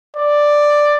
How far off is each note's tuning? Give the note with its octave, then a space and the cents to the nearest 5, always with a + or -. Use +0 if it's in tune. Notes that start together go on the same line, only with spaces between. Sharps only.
D5 +5